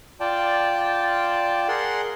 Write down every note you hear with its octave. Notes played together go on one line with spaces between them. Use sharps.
F4 D5 G5 A5
G#4 A#4 F#5 C6